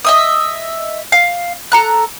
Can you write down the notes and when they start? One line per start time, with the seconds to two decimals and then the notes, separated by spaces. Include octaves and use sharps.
0.05 D#5 E5 D#6
1.12 F5
1.72 A4 A#5 F#6